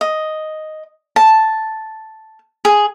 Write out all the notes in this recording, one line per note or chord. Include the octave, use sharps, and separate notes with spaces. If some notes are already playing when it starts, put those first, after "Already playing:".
D#5
A5
G#4